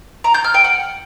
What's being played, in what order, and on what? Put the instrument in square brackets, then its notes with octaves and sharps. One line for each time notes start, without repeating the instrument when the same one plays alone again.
[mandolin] A#5
G6
F6
G5
F#5